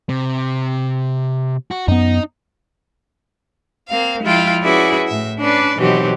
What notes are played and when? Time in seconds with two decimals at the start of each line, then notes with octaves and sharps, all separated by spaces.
0.09 C3
1.71 F#4
1.88 F#2 B3 D#4
3.89 A#3 C4 F5
4.23 F3 G#3 E4 F4 F5 G5
4.63 C#4 E4 F#4 G#4 B4 D5
5.08 A2 E5
5.40 C#4 D4 B4 D5
5.79 B2 D#3 E3 F#3 C4 G4